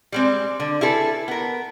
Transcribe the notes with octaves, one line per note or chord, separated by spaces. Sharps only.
G3 G#3 C4
D3
E4 G#4 A4 B4
B3 A#4